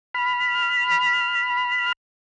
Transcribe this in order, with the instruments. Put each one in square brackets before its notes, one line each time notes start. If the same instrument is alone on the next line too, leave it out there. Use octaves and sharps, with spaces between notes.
[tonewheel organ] B5 F6